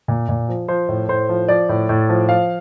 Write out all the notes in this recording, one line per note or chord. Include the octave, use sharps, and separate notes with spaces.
A#2
A#2
F3
F3 C5
A2
A2 C5
F3
F3 D5
A2
A2
F3
F3 F5